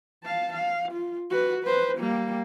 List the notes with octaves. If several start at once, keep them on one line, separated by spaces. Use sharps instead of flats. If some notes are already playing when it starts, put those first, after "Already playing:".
F5 A5
F5
F4
F#4 B4
B4 C5
G3 A#3